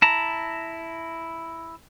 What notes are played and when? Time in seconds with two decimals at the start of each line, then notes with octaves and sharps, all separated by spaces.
0.02 E4 A5 A#5